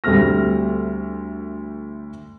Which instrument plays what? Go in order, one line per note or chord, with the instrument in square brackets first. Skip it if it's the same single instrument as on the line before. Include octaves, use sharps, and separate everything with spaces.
[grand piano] D2 G3 A3 C4 F6 A#6